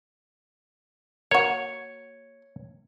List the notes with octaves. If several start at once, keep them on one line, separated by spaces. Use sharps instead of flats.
A#3 F#4 C#5